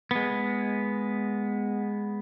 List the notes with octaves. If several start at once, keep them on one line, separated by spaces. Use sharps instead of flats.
G#3 B3